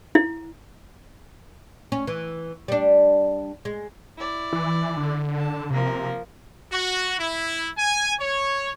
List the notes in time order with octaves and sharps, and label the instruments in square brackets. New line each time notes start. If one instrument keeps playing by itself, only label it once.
[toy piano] E4
[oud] C#4
E3
G3 D4
G#3
[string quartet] E4 D5
[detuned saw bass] E3
D3
[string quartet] A5
[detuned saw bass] C3 [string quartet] F3 A#3 A#4
[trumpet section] F#4
E4
G#5
C#5